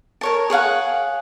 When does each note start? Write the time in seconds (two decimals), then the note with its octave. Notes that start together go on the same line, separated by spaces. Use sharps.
0.21 A#4 C#5 A5
0.50 G#4 C#5 F5 F#5